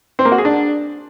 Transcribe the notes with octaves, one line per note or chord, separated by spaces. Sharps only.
C4
A#3
F#4
G#4
D4